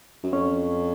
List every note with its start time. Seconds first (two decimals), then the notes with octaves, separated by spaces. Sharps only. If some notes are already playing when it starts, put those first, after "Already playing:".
0.23 F#2
0.33 F2 C#4